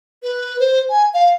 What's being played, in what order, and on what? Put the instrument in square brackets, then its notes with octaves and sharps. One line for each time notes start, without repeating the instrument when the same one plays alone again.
[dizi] B4
C5
G#5
F5